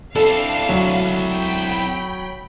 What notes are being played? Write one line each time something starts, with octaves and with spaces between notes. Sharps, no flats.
C4 D4 E4 A4 F5
D2 F#3
G5 B5